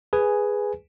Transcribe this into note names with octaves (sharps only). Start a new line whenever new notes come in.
G#4 B4 G#5